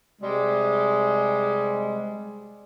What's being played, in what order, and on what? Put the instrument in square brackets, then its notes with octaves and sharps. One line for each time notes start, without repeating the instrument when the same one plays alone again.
[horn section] C3 G3 G#3